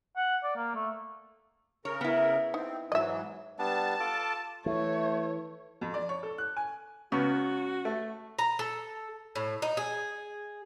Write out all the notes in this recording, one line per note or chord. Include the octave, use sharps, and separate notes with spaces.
F#5
D5
A#3
A3
C#3 A#4 C#5
B3 E4
C4 D#4
G#2 E3 F#3 D#5 E5
G3 B3 D4 A5
F4 A4 D6
E3 A3 C#5
F2
D5
C#5
A4
F#6
G#5
C#2 B3 C#4 F#4
A3
A#5
A4
A2
D#4
G#4